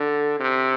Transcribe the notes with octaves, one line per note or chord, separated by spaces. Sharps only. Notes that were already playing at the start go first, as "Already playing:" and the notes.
Already playing: D3
C3